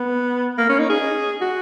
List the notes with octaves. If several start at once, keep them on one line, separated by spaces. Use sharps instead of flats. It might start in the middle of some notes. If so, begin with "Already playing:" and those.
Already playing: B3
A#3
C#4
D#4
G#4
F#4